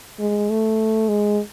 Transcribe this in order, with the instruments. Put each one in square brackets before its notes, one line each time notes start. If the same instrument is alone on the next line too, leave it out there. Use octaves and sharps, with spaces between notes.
[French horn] G#3
A3
G#3